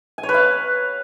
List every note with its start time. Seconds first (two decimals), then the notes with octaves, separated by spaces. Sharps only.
0.18 G#5
0.23 C#5
0.29 B4
0.34 F5